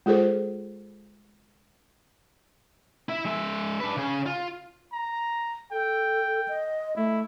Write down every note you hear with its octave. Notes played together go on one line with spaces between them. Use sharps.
G#3 F4 G#4 A4 C5
E4 E5
G#3 E5
D4 B4
C#3 G#4
F4
A#5
A4 G5
D#5
A3 E4